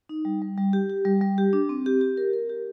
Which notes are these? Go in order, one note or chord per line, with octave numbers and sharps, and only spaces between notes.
D#4
G3
G3
G3
G4
G4
G3
G3
G4
D4
C4
G4
G4
A#4
A#4
G4